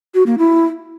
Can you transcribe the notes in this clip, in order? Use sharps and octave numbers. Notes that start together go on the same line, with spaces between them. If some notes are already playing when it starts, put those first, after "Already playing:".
F#4
A#3
E4